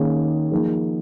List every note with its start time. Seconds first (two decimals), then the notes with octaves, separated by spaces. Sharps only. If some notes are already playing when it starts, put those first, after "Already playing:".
Already playing: D#3 A#3 C#4 G#4
0.51 F3 A#3 D#4 G#4